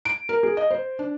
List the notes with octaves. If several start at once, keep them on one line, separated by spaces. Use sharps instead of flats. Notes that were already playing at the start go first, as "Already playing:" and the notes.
D7
A#4
G#4
D#5
C5
D4